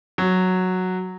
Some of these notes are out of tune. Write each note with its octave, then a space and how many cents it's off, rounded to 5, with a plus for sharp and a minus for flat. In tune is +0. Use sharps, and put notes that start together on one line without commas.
F#3 -5